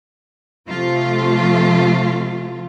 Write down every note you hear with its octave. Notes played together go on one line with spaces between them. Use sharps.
C3 F3 A3 F4